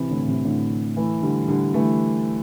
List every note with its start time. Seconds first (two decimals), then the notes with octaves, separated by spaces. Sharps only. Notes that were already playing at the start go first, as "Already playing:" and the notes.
Already playing: C3 E3
0.10 A2 D3
0.28 C3
0.45 A2 D3
0.96 E3 A3
1.22 D3 G3
1.48 D3 G3
1.74 E3 A3